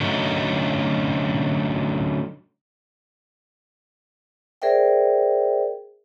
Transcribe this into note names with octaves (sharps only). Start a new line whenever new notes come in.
D3 F#3 A3 C#4 D#4
G#4 A#4 C5 D5 E5 G5